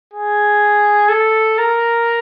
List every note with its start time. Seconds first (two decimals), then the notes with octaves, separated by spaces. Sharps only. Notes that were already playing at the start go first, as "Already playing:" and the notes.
0.14 G#4
1.09 A4
1.58 A#4